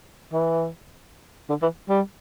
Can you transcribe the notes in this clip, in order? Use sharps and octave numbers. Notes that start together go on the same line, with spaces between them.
E3
D3
E3
G3